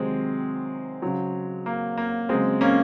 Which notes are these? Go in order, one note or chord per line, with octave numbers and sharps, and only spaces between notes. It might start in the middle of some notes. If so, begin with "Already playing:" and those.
Already playing: C3 D#3 F#3 G#3 C4
C#3 F#3
A#3
A#3
C#3 F#3 G#3 C4
A#3 C#4